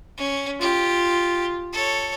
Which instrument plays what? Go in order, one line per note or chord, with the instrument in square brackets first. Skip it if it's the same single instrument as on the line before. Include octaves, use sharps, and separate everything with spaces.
[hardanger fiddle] C#4
[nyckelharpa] F4 [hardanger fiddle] G4
[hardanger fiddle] A4 C#5